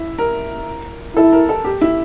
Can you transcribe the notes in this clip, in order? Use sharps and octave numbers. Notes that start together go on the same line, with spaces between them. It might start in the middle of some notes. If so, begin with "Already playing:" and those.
Already playing: E4
A#4
E4 A4
A#4
A4
G4
E4